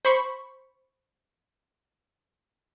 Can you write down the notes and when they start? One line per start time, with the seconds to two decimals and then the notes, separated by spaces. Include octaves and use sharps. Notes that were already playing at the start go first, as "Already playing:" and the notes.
0.05 C5 B5 C#6